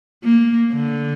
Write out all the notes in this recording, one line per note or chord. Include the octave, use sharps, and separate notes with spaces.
A#3
D3